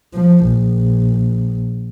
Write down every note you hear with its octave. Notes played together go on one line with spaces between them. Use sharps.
F3
A#1